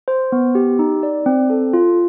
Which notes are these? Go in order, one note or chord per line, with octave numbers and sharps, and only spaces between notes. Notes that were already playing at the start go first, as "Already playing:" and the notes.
C5
B3
G4
D#4
D5
C4
A4
F4